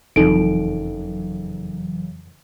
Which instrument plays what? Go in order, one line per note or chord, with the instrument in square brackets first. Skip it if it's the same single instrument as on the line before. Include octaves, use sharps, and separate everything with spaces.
[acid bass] F#1 [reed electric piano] F2 [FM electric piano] C#3 E3 F#3 [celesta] D#4 A4 D7